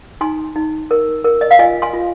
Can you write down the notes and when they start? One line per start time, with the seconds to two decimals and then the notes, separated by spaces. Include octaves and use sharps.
0.21 D#4 G#5 C6
0.56 D#4
0.91 A#4
1.24 A#4
1.41 D#5
1.51 F5
1.59 F4 D#5 G#5
1.82 G#5 C6
1.93 F4